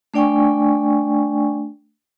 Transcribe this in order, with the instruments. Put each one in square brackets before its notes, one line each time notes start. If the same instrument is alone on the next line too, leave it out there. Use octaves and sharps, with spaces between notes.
[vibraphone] A3 D4 D5 G5 G#5 C#6